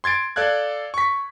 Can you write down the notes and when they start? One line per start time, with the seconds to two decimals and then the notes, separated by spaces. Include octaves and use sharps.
0.04 C6 G#6 A6 D7
0.36 A4 D5 F5 F#6 G#6
0.94 C#6 B6